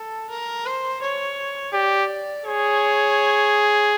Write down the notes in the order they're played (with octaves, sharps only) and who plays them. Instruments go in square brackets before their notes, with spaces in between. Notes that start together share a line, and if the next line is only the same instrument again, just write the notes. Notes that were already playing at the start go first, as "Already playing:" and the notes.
Already playing: [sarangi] A4
A#4
C5
C#5
[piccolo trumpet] G4 [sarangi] D5
[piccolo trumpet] G#4 [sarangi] C#5